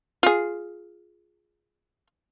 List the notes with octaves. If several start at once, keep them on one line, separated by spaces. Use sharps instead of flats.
F4 G#4